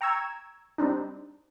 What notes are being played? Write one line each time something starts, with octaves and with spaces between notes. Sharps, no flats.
G5 A#5 C#6 E6 G#6
G3 C4 D4 D#4